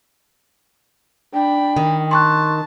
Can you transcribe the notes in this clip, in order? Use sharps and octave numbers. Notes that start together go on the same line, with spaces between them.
D4 G5 B5
D#3
A5 C6 C#6 F#6